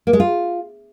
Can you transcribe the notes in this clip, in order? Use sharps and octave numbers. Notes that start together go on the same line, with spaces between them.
A#3
G#3
F4